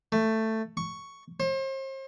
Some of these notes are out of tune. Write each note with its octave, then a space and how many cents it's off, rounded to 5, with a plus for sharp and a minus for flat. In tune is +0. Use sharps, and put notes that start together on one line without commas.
A3 +10
C#6 +5
C5 +40